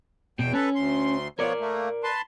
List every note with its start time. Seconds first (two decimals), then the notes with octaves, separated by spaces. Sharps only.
0.39 E2 B2 G5
0.54 C#4 A4 B4
0.75 D2 C6
1.39 F3 B3 A#4 C#5 D5
1.60 A3 A#3
2.04 B4 A5 C6